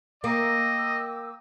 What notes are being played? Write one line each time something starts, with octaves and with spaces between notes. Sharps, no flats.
A#3 D#5 G5 D6 E6